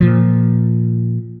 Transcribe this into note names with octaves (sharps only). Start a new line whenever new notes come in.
A#2 F3